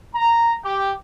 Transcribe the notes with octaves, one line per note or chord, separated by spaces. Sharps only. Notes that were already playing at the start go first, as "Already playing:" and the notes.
A#5
G4